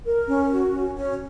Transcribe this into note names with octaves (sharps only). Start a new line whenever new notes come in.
A#4
C#4
F#4
C#4
C#4